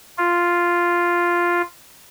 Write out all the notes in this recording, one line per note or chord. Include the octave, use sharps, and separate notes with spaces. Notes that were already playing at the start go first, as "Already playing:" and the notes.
F4